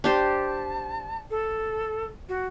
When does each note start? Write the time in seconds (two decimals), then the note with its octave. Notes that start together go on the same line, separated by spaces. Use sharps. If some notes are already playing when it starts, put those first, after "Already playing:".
0.04 D4 G4 C5 A5
1.31 A4
2.29 F#4